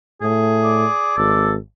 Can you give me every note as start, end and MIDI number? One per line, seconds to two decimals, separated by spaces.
0.22 0.85 45
0.22 1.13 68
0.64 1.50 74
1.18 1.56 32
1.18 1.51 69